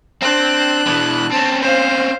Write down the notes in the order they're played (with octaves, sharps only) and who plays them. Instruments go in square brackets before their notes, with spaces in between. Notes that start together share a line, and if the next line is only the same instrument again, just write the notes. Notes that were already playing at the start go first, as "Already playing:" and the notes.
[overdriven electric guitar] C4 [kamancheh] D4 F#6
[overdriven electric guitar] B2 E3
[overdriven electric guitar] C4 C#4 [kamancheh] A5
[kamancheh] C5 F5